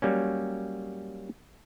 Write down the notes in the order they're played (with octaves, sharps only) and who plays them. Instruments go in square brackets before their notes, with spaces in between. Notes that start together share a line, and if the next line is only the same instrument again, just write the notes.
[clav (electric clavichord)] F#3 G3 A#3 C#4